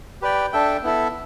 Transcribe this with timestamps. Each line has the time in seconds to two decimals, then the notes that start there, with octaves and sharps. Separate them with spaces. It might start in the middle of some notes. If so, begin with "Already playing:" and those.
0.22 G4 B4 D5 G5
0.52 D4 A4 E5 G5
0.83 B3 E4 A4 E5